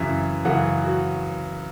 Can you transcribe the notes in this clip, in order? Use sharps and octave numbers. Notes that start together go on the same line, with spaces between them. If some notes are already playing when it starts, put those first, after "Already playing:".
Already playing: F#2 C#3 E3 E5
F#2 C#3 E3 F#5
F#4